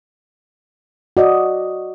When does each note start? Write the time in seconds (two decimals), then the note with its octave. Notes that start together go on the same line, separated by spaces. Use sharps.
1.17 F#4 D5 D#5